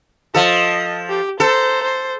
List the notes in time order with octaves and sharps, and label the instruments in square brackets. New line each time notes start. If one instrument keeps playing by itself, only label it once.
[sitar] F3 A4 [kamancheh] D#5
[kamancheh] G4
[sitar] A4 [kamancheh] C5 A#5
[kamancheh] C5